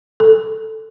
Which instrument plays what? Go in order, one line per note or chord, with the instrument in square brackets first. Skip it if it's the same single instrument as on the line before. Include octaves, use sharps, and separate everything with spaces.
[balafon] A4